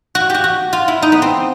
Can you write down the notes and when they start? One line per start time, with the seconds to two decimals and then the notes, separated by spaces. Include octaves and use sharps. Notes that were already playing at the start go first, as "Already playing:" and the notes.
0.15 F#4
0.30 F#4 G4
0.44 F#4
0.73 F4
0.88 E4
1.02 D#4
1.12 B3
1.22 C4